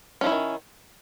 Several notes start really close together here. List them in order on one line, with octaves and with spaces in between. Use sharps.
C#4 F3 E4 F#3 D#3